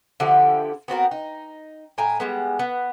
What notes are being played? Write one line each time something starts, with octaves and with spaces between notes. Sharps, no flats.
D3 F3 E4 G4
B3 C4 F#4 A#4
D#4
A2 G5 G#5 A#5
G3 G#3 B3
B3